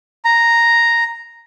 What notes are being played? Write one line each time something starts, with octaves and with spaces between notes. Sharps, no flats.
A#5